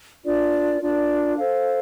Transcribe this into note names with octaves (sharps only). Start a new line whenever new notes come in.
D4 F4 A#4 D5
D4 F4 A#4 D5
A4 C5 F5